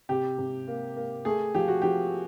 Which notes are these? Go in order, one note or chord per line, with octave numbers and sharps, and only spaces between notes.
C3 G4
C3
A#3
A#3
A3 G#4
F3 G4
F#4
F3 G4